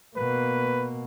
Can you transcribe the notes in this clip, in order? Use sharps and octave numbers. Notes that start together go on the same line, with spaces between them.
B2 A#3 B4